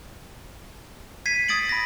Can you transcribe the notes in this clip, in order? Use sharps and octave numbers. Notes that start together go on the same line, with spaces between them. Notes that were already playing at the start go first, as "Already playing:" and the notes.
G#6 B6 C7 D#7
D#6 G#6 A6 D7 F#7
B5 A6 A#6